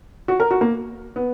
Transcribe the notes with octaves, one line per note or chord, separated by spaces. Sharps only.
F#4
A#4
F#4
A#3
B3